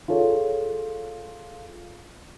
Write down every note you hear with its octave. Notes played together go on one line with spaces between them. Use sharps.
F4 G#4 A4 C#5